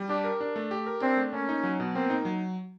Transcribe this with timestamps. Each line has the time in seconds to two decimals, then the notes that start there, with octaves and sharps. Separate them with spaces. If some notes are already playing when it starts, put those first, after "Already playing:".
Already playing: G3
0.09 D4 G4
0.24 A#4
0.41 D4
0.56 A3
0.71 G4
0.86 A#4
1.01 C4 D4
1.17 A3
1.33 A#3 C#4
1.49 D#4
1.63 F#3
1.80 B2
1.94 A#3 C4
2.10 D#4
2.25 F#3